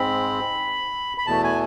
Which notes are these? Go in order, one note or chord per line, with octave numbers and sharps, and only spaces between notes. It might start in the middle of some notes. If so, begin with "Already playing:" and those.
Already playing: G#2 G#3 C4 B5
B5
E2 B2 A3 A5
G#5